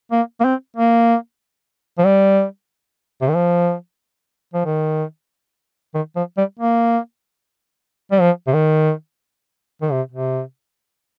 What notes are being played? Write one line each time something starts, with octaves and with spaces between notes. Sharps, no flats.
A#3
A#3
C4
A#3
F3
G3
C3
D#3
F3
F3
D#3
D#3
F3
G3
A#3
G3
F3
C3
D#3
D#3
C3
C3